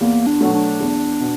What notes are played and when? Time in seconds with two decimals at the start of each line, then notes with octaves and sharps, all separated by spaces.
0.01 E2 A#3
0.27 D4
0.41 B2 F#3 A3
0.54 D4
0.80 E2
1.20 B2